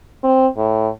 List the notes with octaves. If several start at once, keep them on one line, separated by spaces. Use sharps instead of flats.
C4
A2